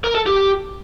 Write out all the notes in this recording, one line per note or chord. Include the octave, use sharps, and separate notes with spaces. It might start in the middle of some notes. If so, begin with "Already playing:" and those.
A#4
A4
G4